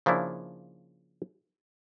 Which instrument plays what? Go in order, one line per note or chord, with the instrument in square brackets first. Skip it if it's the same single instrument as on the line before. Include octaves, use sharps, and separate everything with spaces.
[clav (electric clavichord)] C#3 F3 A#3 D4 E4